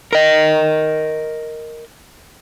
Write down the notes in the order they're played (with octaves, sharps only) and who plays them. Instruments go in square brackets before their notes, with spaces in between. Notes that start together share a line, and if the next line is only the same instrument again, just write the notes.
[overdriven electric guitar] A#4 D#5